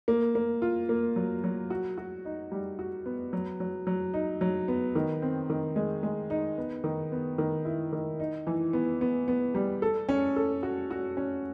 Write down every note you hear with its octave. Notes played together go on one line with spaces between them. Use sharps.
A#3
A#3
F4
A#3
F#3
F#3
F#4
F#4
D#4
G3
F#4
B3
F#3
F#3
F#3
D#4
F#3
B3
D#3
C4
D#3
G#3
G#3
D#4
B3
D#3
B3
D#3
E4
D#3
D#4
E3
B3
B3
B3
G3
A4
C#4
A4
F#4
F#4
C#4